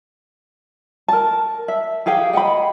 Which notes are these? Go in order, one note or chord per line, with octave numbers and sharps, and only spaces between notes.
A#4 A5
E5
G4 G#4 F5 G5
D#5 F#5 G5 B5